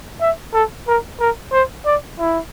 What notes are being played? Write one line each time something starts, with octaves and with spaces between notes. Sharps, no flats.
E5
A4
A#4
A#4
C5
D5
E4